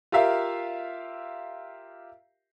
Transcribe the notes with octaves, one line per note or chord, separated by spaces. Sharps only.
F4 G4 A#4 E5 F5